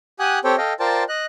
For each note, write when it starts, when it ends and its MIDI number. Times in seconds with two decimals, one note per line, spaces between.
0.20 0.39 67
0.20 0.39 78
0.20 0.39 80
0.20 0.39 87
0.20 0.39 90
0.44 0.56 60
0.44 0.56 67
0.44 0.56 69
0.44 0.56 72
0.44 0.56 73
0.44 0.56 79
0.58 0.73 69
0.58 0.73 75
0.58 0.73 77
0.58 0.73 79
0.80 1.04 65
0.80 1.04 70
0.80 1.04 72
0.80 1.04 74
0.80 1.04 79
0.80 1.04 81
1.09 1.26 75
1.09 1.26 90